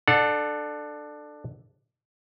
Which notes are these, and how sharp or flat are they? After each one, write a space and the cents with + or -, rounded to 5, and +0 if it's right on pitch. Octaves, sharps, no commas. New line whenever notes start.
D4 +20 A4 +0 F#5 -30